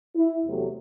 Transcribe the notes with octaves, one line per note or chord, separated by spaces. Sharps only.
E4
E2 C3 F#3 A3